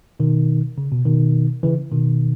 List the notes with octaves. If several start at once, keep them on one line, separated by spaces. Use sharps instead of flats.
B2 D#3
C#3
B2
B2 D#3
C#3 E3
B2 D#3